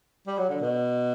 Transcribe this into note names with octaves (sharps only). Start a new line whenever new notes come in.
G3
F#3
D3
B2